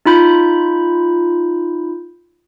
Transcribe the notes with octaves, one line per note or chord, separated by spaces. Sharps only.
D#4 F4 B5 G6